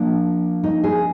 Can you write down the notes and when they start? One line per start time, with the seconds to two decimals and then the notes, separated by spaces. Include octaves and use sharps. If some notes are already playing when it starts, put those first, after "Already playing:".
Already playing: F3 A#3 D4
0.64 D#4
0.84 G#4